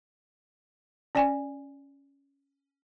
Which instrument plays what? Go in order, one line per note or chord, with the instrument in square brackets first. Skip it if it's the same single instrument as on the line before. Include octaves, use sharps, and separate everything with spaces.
[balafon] C#4 D5 G5 G#5